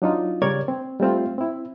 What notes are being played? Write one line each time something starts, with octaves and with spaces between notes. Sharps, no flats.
F#3 D4 D#4 F4
C#3 G3 A#4 C#5 D5 G#6
C4
G3 A3 C4 F4
C4 E4